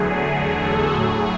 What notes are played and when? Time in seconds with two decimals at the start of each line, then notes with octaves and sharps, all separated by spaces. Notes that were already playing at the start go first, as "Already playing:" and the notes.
Already playing: E2 D3 F#3 A3 G#4
0.27 G#4
0.63 A4
0.97 A2 F#3 A3 G#4